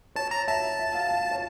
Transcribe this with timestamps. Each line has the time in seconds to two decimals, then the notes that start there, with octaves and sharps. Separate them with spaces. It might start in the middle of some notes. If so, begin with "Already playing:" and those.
0.16 C#5 A5
0.31 A#5
0.48 E5 A5
0.79 E5
0.94 F5
1.11 F5
1.31 C#5